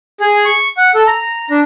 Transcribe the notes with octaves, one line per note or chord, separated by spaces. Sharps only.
G#4
C#6
F#5
A4
A#5
D4